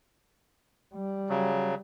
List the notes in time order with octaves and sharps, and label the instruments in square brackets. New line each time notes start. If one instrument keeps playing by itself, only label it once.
[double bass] G3
[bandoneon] C#3 F#3